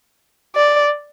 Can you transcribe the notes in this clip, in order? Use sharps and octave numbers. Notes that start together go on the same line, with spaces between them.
D5